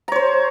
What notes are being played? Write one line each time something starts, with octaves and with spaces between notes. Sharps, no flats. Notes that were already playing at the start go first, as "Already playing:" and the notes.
C5 C#5 A#5